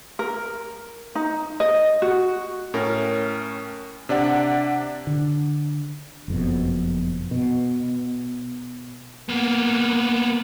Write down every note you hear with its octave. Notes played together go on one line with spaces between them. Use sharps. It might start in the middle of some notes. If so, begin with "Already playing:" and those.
A#4
D#4
D#5
F#4
A2 C#4 A#4
C3 D4 D5 F#5
D3
F#1 F2 B2
B2
A#3 B3